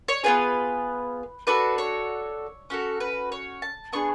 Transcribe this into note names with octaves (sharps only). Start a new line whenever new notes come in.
C#5
B3 F4 G#4 B4
D4 F#4 A4 B4
C#5
C#4 F#4 A4
B4
C#5
A5
B3 D4 G#4 C#6